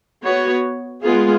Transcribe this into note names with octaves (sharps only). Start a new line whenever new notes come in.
B3 F#4 C#5
G#3 B3 F4 G#4